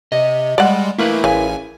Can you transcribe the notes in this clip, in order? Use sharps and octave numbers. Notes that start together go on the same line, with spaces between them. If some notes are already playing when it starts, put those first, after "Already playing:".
C3 D#5
G3 G#3 D5 F#5
A3 A#3 E4 A#4 B4
A1 C#3 G#5